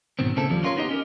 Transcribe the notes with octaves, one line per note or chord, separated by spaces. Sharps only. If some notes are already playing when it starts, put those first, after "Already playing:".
G#2 B2 D#3 C4
C#3 A#3 C4 E4 A4
D#2 F3 G3
C#4 D4 F4 A#4 C#5 C6
B3 D#4 G4 D#5
C#4 G4 A#4